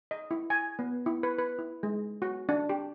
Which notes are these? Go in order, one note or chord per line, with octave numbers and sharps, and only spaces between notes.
D#5
E4
G#5
B3
E4
B4
B4
E4
G#3
F#4
D4
G4